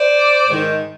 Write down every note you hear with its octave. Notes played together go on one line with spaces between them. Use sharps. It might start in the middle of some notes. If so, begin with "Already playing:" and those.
Already playing: C5 D5
G#2 D#3